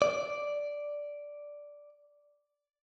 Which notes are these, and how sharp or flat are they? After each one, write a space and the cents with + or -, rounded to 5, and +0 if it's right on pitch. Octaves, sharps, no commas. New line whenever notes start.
D5 -5